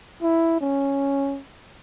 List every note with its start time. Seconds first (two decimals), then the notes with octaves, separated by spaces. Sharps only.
0.22 E4
0.61 C#4